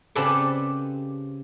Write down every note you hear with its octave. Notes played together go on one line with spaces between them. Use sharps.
C#3 C4 G4 A4 B4 D5